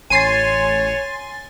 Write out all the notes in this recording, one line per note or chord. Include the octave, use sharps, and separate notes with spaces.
A1 C#5 G#5 C6 A6 C7 D#7